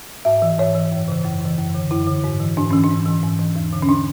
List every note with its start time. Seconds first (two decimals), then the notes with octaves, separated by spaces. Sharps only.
0.25 G#2 E5
0.42 E3
0.58 G#2 C#5
0.75 E3
0.92 F#2
1.08 C#3 E3
1.25 F#2
1.41 C#3 E3
1.58 F#2
1.75 D3
1.90 F#2 E4
2.07 D3
2.24 G#2
2.40 E3
2.57 G#2 D4
2.71 E3 C#4
2.84 D4
2.90 G#2
3.06 E3
3.23 G#2
3.39 E3
3.56 E2
3.73 D3
3.82 C#4
3.89 D4